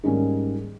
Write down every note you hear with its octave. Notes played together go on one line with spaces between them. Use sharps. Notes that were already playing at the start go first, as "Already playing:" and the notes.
G#2 D#3 G3 A#3 C#4